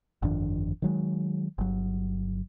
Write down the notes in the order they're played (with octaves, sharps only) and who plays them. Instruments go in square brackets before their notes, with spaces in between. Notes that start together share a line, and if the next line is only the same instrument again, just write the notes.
[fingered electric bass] G1 F2 D#3 D4
D#3 F#3 G#3
G1 F#3